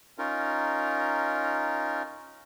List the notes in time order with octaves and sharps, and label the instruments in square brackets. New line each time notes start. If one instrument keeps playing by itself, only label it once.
[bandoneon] C#4 D#4 F4 A#4